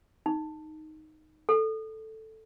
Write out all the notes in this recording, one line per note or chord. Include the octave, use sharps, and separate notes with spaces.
D#4
A4